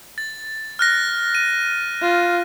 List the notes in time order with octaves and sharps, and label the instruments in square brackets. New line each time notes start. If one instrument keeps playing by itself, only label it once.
[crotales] A6
F6 F#6 A#6
D#7
[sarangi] F4